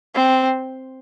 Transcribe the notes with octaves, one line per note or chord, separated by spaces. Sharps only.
C4